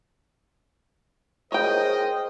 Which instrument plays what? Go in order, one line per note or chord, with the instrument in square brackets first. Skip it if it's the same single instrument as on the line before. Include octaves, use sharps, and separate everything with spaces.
[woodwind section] G#4 A#4 C5 [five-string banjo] C#5 G5 [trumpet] D#5